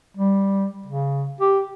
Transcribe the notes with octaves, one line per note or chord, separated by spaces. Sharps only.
G3
C#3
G4